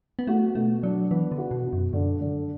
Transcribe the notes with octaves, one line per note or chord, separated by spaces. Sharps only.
B3
A3 F#4
B2 A3
F#3 D4
E3 B3
D3
F#4
B2
B2
F#2
F#2 D3
D3